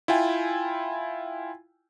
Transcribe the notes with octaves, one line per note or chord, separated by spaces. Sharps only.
E4 F4 G5 G#5